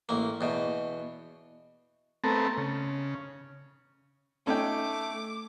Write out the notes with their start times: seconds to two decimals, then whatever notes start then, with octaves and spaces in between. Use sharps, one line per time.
0.09 A1 A#3
0.41 E2 B2
2.24 A3 B3 C4 A4 A#4
2.58 C#3
4.47 A3 C#4 D#4 G5 D6